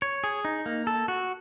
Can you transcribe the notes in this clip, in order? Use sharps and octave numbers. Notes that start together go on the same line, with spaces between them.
C#5
G#4
D#4
A#3
A4
F#4